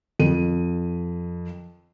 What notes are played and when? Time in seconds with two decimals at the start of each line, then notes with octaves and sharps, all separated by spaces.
0.19 F2 D#7